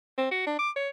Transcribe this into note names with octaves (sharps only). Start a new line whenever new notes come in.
C4
F#4
D4
D6
C#5